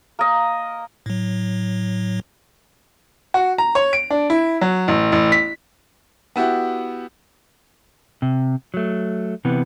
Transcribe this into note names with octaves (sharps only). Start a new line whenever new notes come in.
A#3 D#5
A2 F#3
F#4
A#5
C#5
D7
D4
E4
F#3
A1
A1
B6
B3 E4 F#4 G4
C3
F#3 A3
C3 E3 B3